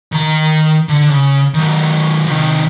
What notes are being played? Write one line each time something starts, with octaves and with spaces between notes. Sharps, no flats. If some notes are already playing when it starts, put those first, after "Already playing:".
D#3 A#5
D3
C#3
D#3 F#3
C3 D#3